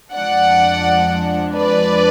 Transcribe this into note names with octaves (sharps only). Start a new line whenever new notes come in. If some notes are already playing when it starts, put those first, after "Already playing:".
F2 F3 G#3 D4 D5 F#5
B4 D5